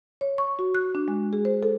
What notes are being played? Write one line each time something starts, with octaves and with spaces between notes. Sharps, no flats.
C#5
C#6
F#4
F#6
D4
G#3
G#4
C5
A4